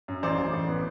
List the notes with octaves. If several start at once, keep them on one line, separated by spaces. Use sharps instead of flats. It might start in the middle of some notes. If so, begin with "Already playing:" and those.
F#2
A1 C5 D5
A1
A1
B3